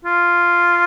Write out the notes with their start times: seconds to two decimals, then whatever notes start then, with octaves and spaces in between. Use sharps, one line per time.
0.05 F4